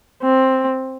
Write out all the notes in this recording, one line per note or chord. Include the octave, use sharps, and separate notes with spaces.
C4